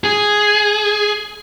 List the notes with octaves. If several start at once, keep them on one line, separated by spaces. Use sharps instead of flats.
G#4